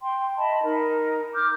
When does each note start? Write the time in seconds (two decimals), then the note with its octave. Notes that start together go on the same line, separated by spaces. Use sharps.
0.02 G5 C6
0.38 D#5 E5 A5 B5
0.64 D#4 A#4
1.34 D6 F6 G6